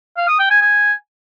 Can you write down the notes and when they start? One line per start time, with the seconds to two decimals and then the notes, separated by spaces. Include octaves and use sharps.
0.17 F5
0.28 D#6
0.39 G5
0.50 G#5
0.61 G#5